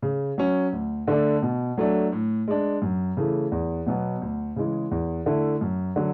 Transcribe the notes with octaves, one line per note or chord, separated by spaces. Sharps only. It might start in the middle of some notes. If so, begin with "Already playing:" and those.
C#3
F#3 C#4
D2
D3 A3 D4
B2
F#3 A3 D4
A2
G#3 D4
F#2
C#3 E3 A3
E2
B2 F#3 B3
D2
C#3 E3 G#3
E2
D3 A3 E4
F#2
D3 F#3